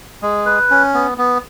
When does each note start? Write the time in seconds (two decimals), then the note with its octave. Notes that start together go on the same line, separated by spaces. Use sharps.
0.22 G#3
0.46 B4
0.70 C#4
0.94 B3
1.18 B3